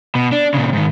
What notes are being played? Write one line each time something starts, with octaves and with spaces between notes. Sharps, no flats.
B2
D4
A#2 C#3
G#2 D#3